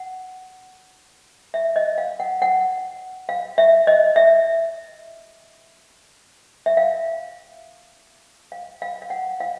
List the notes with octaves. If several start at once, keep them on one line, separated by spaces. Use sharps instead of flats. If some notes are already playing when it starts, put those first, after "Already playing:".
Already playing: F#5
E5
D#5
F5
F#5
F#5
F5
E5
D#5
E5
E5
F5
F5
F5
F5
F#5
F5